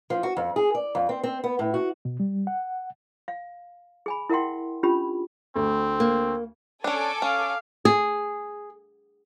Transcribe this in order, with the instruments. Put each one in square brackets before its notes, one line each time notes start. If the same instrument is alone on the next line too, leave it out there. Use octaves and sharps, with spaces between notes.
[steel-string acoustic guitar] F3
F#4
F2
G#4
D5
F2
C4
C4
B3
A2
F#4
[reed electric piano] B2
G3
F#5
[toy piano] F5
G#4 G#5 B5
E4 A#4 E5 F#5 G5 C6
C#4 D4 F4 G4 B5
[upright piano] D2 [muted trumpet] C4
[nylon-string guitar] A#3
[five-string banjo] C#4 D4 [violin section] A4 G#5 D6
[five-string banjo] C#4 [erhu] F5
[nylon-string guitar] G#4